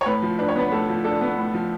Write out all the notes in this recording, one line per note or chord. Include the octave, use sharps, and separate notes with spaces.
C#5
A2 B4
F3
D4 B4
C#5
B3 B4
A2 A4
F3
D4 A4
B3
A2
F3